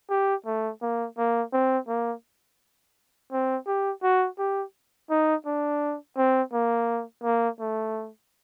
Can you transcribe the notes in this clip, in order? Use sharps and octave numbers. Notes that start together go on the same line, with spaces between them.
G4
A3
A#3
A#3
C4
A#3
C4
G4
F#4
G4
D#4
D4
C4
A#3
A#3
A3